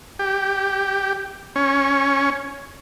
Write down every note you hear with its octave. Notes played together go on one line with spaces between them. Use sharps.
G4
C#4